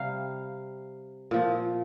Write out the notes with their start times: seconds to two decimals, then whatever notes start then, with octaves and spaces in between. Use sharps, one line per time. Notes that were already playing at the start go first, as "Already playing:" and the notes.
Already playing: C3 G3 F5
1.31 A#2 F3